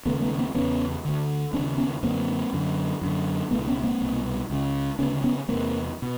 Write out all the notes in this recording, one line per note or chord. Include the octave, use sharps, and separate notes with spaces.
D#2 C#3 A3 B3
A3 B3
A#3 C4
E2 C#3 B3 C#4
D2 D3
D#2 C4 D4
C#3
B3 C#4
F#2 D3 A#3 C4
F#2 D3
F#2 D3
C#2 B2 A3 B3
B3 C#4
A#3 C4
C2 B2
C#2 C#3
D2 C#3 B3 C#4
B3 C#4
E2 C3 A#3 C4
B2